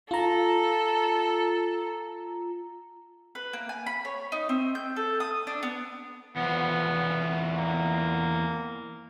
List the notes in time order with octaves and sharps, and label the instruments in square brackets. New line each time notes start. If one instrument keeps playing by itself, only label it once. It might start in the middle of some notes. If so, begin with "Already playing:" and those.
[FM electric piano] F4 A#5 [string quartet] A4
[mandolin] B4
A#3
G#5
B5
C#5
D#4
C4
G6
A4
D#6
D4
B3
[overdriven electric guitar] E2 F3 [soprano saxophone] B3
[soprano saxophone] A#3